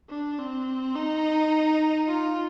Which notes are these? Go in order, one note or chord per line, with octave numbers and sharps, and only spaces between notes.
D4
C4
D#4
F4